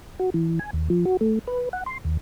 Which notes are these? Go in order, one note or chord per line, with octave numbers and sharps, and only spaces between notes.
F#4
E3
G#5
D#2
F3
F#4
A3
B4
F#5
C6
D#2